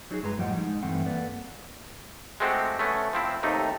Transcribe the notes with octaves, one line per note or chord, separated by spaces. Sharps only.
F#3 D#4 F#4 G#4
G2 G#3 B4 A#5
F#2 A2 F3 G3 D#5 F#5
G#3 D#4
G2 E3 A3 C4 F#5
A#3 A4 B4 D5 F#5
G#3 A3 C4 F#4 G4
A3 B3 C#4
F3 C4 E4
D#2 C3 A3 D#4